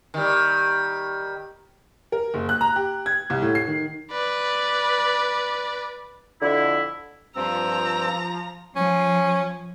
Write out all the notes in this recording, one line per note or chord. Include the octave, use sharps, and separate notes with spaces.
D#3 G3
A#4
F#1
F#6
A#5
G4
G#6
C2
A2
C7
D#3
B4 D5
F2 D3 E4
G2 F3 C4 A#5 E6
F3 C#4